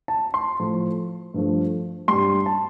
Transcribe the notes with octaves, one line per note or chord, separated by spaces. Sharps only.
A5
C6
A2 F3 A3
G2 F3 A3
G2 G3 C6
A5